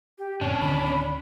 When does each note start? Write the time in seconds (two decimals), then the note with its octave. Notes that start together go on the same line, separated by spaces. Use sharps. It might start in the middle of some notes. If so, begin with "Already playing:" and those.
0.18 G4
0.41 F1 A2 C#3 C#4 D4 A5
0.61 D1 D3 D#3 B5